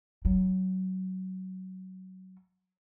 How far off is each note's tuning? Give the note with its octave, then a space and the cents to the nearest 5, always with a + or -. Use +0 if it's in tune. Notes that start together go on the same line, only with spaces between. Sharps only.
F#3 +15